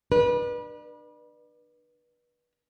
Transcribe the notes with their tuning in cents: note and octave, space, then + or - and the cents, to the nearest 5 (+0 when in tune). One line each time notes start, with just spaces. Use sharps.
D4 +35 B4 -30